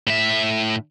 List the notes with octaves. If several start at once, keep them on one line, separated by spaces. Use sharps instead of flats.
A2 E5